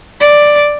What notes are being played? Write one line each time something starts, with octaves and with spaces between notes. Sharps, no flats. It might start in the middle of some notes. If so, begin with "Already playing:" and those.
D5